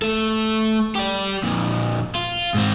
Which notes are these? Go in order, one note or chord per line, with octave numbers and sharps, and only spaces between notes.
A3 A4
G4 D5
F2 A#2
F4
G#2 C4